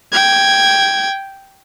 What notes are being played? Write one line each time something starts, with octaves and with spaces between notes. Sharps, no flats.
G5 G#6